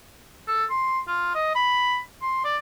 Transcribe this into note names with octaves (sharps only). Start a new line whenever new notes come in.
A4
C6
F4
D#5
B5
C6
D5